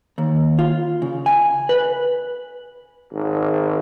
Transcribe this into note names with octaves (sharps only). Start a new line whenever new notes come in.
D#2
F4
C#3
G#5
B4
G#1